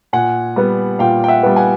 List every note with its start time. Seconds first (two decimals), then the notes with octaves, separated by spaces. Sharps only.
0.13 A#2 F#5 G#5
0.56 G3 B3
0.99 A#2 F5 G5
1.24 G5
1.28 E5 F#5
1.43 G3 B3
1.56 F#5 G#5